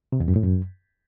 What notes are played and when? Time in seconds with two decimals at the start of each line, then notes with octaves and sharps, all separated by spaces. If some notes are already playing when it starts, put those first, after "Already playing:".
0.12 C3
0.20 E2
0.28 F#2
0.36 A2
0.44 F#2